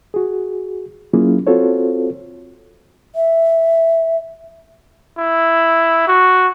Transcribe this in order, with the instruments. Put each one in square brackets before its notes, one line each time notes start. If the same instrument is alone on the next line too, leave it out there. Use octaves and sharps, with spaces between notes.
[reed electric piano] F#4 G#4
F#3 A#3 C#4 E4 F4 G#4
C4 F4 F#4 A4 C5 C#5
[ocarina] E5
[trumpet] E4
F#4